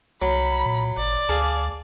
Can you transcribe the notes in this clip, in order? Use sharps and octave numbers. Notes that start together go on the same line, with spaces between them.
C2 F#3 B5
A#2
G#1 D5
D2 G#4 F5 A5